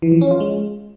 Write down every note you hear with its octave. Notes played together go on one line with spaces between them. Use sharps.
E3
F3
C#4
F4
G#3